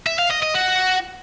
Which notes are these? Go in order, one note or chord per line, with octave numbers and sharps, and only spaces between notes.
E5
F5
D#5
D#5
F#4